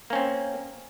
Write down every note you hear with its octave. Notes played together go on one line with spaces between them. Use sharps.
A#3 C4 C#4